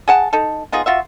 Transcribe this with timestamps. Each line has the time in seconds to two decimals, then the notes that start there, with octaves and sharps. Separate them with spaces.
0.08 G#4 F#5 A5
0.33 D#4 A4
0.72 B3 D#4 F4 G#4
0.86 F4 F#4 E5